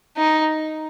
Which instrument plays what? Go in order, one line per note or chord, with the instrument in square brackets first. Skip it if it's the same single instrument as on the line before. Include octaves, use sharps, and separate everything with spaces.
[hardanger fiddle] D#4